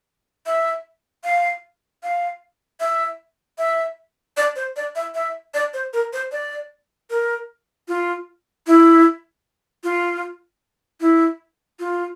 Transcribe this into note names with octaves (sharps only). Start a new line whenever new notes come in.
E5
F5
F5
E5
E5
D5
C5
D5
E5
E5
D5
C5
A#4
C5
D5
A#4
F4
E4
F4
E4
F4